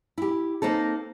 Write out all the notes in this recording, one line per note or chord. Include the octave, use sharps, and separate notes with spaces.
E4 G4
A#3 C4 D#4 A4